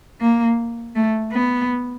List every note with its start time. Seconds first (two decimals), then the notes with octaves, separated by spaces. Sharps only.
0.20 A#3
0.95 A3
1.32 B3